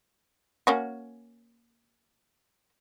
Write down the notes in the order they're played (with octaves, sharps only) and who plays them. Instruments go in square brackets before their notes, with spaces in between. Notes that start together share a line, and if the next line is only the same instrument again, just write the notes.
[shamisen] A#3 C#4 F#4